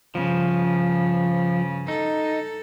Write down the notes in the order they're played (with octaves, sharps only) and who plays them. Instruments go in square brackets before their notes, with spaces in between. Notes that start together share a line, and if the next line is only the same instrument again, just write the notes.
[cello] G2 C#3 [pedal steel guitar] F3
[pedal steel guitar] D#4 [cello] A4